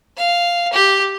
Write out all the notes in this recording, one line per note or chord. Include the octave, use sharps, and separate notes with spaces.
F5
G4